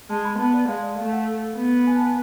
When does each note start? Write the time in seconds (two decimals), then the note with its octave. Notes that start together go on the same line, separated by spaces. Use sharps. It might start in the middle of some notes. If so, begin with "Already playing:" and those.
0.10 G#3 A5
0.25 B5
0.39 B3 A5
0.54 D5
0.68 G#3 F5
0.83 D5
0.98 A3 F5
1.13 F#5
1.57 B3
1.87 G#5
1.96 A5
2.06 G#5